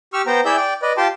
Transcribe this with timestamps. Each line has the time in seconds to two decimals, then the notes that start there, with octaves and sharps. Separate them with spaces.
0.13 G4 C#6 E6 F6
0.27 B3 C5 G5 A#5
0.45 E4 G#4 D5 E5 E6 G6
0.57 D5 G5
0.82 B4 D5 D#5
0.97 F4 G4 G5 A5 C6